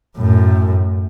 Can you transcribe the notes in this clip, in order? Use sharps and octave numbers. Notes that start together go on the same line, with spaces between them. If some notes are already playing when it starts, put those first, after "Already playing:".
F#2 A2